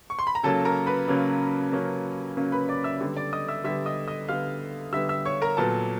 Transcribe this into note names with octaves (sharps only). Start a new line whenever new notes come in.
C#6
C6
B5
A#5
C#3 F#3 A#3 C#4 A4 A5
A#4 A#5
B4 B5
C#3 F#3 A#3 C#4
C#3 F#3 A#3 C#4
C#3 F#3 A#3 C#4
B4 B5
D5 D6
E5 E6
D3 G3 B3
D5 D6
D#5 D#6
E5 E6
D3 G3 B3 E5 E6
D#5 D#6
D#5 D#6
D3 G3 B3 F5 F6
D3 G3 B3 E5 E6
E5 E6
C#5 C#6
A#4 A#5
A#2 F#3 B3 A4 A5